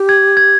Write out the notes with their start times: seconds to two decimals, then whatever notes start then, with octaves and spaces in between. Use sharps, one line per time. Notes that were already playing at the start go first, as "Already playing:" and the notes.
Already playing: G4
0.09 G#6
0.37 G#6